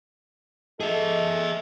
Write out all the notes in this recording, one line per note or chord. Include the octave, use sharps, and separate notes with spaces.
G#4 A4 D#5 E5